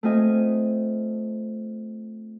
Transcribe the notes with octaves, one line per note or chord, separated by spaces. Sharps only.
A3 C4 F4 D#5 G#5